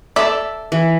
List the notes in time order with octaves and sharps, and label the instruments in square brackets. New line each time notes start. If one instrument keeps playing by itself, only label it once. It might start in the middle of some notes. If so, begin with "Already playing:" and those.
[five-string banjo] A4 D5 E5
[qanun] E3